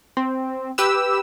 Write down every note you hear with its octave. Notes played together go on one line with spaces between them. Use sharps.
C4
G4 B4 E6